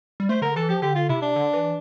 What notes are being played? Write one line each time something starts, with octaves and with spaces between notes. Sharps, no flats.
G3
A3 C5
D3 A#4
E3 A4
F3 G4
D3 G4
F4
C3 E4
D4
D3
E3